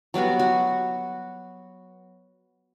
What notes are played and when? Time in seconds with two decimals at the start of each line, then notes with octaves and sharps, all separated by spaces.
0.14 F#3 G3 B3 F#4
0.39 F#4